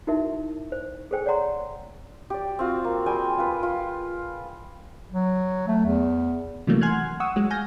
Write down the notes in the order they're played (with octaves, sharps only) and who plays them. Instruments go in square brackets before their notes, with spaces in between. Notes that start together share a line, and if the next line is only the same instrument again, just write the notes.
[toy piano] D#4 E4 F#4 A#4 E5
C5
G#4 A4 C5 G5 G#5
C#5 D5 F#5 A#5 C6
[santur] G4 D5
C4 F4 F#4
A#3
G3 G#4 G5 G#5
F4 B4
F4
[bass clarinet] F#3
A3
E2
[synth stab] C3 E3 F#3 G3 A3 A#3
F#5 G#5 C6 F6 F#6 G#6
F#5 C#6 D#6 E6
F#3 G#3
F5 G#5 G6 A#6